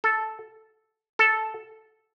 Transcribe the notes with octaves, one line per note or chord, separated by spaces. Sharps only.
A4
A4